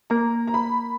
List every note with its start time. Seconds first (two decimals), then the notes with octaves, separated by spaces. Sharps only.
0.10 A#3 A#5
0.47 A#5
0.54 B5